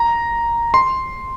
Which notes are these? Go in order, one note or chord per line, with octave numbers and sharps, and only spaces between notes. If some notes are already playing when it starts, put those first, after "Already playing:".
Already playing: A#5
C6